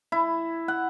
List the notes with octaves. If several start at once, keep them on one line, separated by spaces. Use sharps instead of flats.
E4
F#5